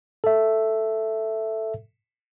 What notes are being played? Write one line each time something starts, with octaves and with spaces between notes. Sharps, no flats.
A4 E5